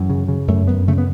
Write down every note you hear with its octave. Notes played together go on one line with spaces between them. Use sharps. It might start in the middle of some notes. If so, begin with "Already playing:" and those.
Already playing: F#2 E3
C#3
C#3
F#2 A3
F#2 B3
C#3 A3
B3